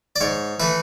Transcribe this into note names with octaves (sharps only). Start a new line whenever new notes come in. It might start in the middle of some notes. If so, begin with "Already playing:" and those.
D5
G#2 C#5
E3 A3 B4